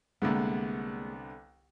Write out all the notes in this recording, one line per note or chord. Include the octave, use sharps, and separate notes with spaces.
C2 D3 G#3 A#3 B3